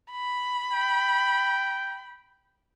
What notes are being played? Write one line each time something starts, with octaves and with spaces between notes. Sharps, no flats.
B5
G5